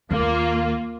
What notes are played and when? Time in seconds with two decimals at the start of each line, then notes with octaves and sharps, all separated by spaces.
0.11 D#2 A#3 F4